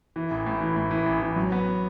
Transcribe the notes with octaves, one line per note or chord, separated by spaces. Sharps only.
E3
A1
A2
E3
A2
E3
A1
E3
F#3
B3